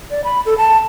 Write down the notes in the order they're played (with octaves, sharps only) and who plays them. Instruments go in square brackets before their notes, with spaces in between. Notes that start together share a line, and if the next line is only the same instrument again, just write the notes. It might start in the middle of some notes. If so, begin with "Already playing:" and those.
[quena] D5
B5
A4
A5